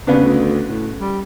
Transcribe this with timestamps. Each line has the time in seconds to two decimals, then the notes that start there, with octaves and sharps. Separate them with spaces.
0.07 D#2 C#3 B3 D4
0.21 D2
0.66 A2
0.99 G3